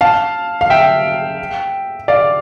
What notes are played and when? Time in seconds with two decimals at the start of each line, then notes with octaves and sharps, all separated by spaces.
0.01 F5 A5
0.61 F5
0.70 E5 G5
2.08 D5 F5